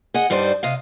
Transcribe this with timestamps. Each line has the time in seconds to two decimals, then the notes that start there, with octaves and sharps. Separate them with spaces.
0.14 G#4 D#5 F#5
0.30 G2 G3 D#4 C5 A5
0.63 C3 D#5 F5